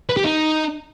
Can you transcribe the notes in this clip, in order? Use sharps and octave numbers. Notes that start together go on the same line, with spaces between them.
B4
G4
D#4